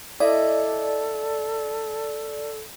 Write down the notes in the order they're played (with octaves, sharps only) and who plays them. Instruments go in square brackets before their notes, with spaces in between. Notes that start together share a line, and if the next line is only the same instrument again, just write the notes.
[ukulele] E4 D#5 [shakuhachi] A4 [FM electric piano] D5